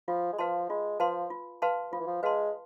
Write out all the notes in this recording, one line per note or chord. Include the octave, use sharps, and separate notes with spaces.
F3 F4
G#3
F3 B4 F5 A5 C6
G#3 F4
F3 B4 F5 A5 C6
F4
B4 F5 A5 C6
F3 F4
E3
F3
G#3 B4 F5 A5 C6